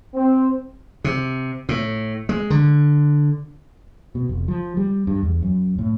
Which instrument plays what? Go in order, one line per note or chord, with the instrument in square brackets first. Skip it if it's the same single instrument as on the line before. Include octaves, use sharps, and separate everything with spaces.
[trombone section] C4
[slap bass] C3
A2
G#3
D3
[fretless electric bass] B2
F1
F3
G3
G2
E2
F#2
A2